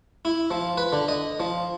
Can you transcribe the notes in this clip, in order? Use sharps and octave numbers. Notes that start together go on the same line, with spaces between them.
E4
F3
B4
D3
D#5
F3